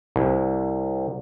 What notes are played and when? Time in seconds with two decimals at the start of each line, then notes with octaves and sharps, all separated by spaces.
0.16 C2